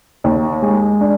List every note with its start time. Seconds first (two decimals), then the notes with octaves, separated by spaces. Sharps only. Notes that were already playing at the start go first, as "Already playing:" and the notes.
0.24 D#2
0.62 G#3
1.01 D4